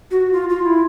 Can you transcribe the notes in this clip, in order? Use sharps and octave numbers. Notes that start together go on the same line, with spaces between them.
F#4
F4
F4
E4